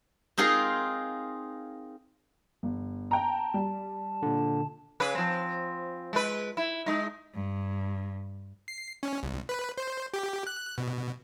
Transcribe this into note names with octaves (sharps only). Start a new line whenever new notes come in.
C4 D#4 F4 G#4 A#4
G1
G5 A5 A#5
G3
A#2 D3
C#3 G#4 B4
F3 C4
G#3 B4
E4
G#3 D#4
G2
C7
C#4
C2
B4
C5
G4
F#6
B2